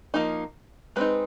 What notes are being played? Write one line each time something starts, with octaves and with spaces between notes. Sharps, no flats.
F3 A#3 D#4
G#3 C4 D#4 B4